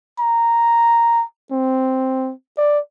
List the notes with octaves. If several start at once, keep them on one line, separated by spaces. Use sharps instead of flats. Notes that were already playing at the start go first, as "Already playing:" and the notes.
A#5
C4
D5